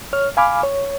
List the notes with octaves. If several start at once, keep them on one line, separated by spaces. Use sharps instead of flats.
C#5 F6
F5 G#5 B5 D6 F6
C#5